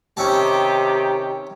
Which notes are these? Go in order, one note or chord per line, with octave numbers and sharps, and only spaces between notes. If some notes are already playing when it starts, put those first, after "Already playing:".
C3 D#3 C#4 G4 E5 A5